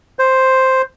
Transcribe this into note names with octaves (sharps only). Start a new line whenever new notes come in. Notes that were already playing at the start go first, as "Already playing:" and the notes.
C5